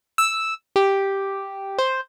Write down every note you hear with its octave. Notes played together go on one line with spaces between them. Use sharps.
E6
G4
C5